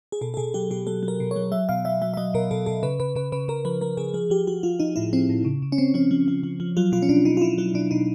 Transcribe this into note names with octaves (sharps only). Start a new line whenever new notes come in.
G#4
B2 A4
A4
B2 G#4
F#3 G4
B2 G4
F#3 A4
F#3
A#4
B2
C#5
F#3
F#3 E5
B2 F5
F#3 E5
F#3 E5
E5
F#3 D#5
B2 A#4
B2 A4
B2 A4
C#3 B4
C#3 B4
C#3 B4
C#3 B4
C#3 A#4
F3 B4
F3 A#4
C#3 G#4
F3 G#4
F3 G4
F3 F#4
F3 F4
F3 D#4
A2 E4
F3 C4
A2
C#3
C#3
C#4
C#3 C4
F3 C#4
F3
F3
F3
F3
F#3 F4
B2 F4
C#4
B2 D4
B2 D#4
F4
B2 E4
F#3 E4
B2 D4
B2 D#4